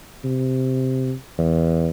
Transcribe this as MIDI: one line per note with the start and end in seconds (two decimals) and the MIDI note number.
0.24 1.12 48
1.38 1.88 40